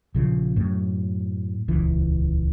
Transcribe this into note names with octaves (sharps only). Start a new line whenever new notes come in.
A#1 C#3 F3
F#2 A2
D#1 C#2 E3